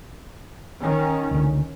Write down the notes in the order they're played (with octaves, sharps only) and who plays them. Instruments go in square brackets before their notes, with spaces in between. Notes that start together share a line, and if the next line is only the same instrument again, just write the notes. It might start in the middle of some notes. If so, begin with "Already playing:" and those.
[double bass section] D#3 C#4
[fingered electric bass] C#2 D3